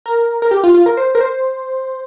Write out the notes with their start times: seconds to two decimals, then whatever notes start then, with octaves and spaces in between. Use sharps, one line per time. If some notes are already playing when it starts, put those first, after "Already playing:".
0.06 A#4
0.42 A#4
0.51 G4
0.64 F4
0.74 F4
0.86 A#4
0.97 C5
1.15 A#4
1.21 C5